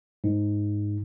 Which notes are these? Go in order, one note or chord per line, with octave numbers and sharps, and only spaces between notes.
G#2